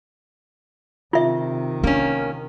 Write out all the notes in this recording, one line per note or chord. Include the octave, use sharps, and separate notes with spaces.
C3 D#3 F4 E5
A#3 C#4 D4